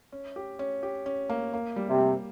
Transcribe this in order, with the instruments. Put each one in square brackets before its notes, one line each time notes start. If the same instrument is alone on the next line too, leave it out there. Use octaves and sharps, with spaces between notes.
[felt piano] C#4
G4
C#4
G4
C#4
A#3
A#3
G3
[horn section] C3
[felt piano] G3